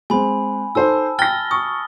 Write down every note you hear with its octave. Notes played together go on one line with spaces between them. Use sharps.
G#3 C4 G#5 B5
D#4 A4 C5 A5 E6
G5 F6 A6 A#6 G7
C#6 D#6